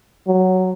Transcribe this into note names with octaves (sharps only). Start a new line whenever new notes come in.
F#3